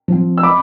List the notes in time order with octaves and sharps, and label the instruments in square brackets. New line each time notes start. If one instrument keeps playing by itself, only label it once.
[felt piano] F3 C4
[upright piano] E6
B5 D6